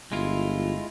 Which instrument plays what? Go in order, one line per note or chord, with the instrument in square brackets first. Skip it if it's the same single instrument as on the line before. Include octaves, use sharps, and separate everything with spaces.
[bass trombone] G1 [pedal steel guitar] G#3 E4 F4